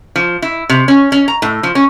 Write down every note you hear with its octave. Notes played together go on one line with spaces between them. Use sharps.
F3
E4
C3
C#4
C#4
A#5
A2
F3
C#4